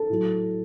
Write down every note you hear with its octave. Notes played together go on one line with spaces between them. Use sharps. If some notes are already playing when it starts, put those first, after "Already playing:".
Already playing: A4
A2 F#3